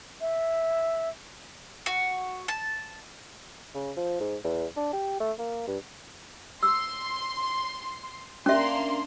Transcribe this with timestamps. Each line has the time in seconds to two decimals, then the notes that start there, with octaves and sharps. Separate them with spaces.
0.21 E5
1.86 F#4
2.48 A5
3.75 C#3
3.97 F3
4.20 G#2
4.44 E2
4.77 D4
4.93 G4
5.20 A3
5.39 A#3
5.68 G2
6.63 C6 E6
8.46 A#3 C#4 D4 E5 C6